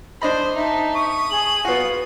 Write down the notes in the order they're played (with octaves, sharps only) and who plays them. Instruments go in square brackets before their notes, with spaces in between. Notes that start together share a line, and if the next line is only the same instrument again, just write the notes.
[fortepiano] D4 D#5 B5 [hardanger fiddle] C5
[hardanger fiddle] D#4 A5 [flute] E5
[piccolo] C#6 [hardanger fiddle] D#6
[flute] G#4 [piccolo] F#7
[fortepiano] B3 F#4 [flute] F4